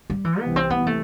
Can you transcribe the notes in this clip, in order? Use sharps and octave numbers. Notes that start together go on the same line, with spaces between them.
G3
E3
C2 C3 E3 B3
C4
B3
A3